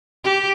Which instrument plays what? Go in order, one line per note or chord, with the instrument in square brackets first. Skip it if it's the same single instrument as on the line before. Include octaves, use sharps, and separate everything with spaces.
[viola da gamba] G4